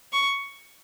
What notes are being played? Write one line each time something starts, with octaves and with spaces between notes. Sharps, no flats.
C#6